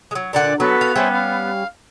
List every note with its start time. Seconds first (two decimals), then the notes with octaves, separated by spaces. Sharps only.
0.11 F#3 G#3
0.33 A#2 D3 D5 F#5
0.60 F#3 B3 F#4 A4 B4
0.81 F5
0.96 G3 C#4 C5 E5 G#5
1.12 F5